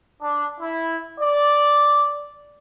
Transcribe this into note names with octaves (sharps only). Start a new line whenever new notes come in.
D4
E4
D5